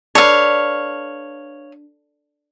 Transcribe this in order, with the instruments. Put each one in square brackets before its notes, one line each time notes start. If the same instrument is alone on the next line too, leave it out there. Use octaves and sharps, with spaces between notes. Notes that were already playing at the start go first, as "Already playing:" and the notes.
[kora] D4 A4 B4 [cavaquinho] C#5 F5